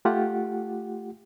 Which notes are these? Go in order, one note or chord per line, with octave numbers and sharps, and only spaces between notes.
A3 F4 G4 F#5